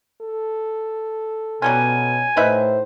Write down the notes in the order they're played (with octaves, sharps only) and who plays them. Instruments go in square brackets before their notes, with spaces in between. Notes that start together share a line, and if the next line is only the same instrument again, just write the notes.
[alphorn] A4
[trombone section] B2 [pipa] F#3 G3 C#4 [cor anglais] G#5
[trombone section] A2 [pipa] D#4 B4 E5 [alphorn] C5